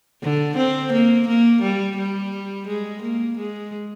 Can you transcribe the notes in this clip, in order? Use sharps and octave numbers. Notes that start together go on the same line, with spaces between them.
D3
C4
A#3
A#3
G3
G3
G#3
A#3
G#3